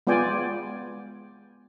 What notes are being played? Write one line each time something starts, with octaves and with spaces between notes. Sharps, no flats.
G#3 B3 F4 D5 G5 G#5